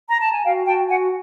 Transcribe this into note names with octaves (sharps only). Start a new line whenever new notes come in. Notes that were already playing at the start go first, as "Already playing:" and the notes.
A#5
A5
G#5
F#4 F5 G5
F#4 G5 A5
F#4 F#5 G#5